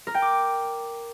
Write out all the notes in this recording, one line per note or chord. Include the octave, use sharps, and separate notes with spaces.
A#4
G5
D6